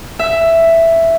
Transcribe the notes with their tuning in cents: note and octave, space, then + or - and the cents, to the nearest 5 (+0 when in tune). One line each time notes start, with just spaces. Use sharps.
E5 +5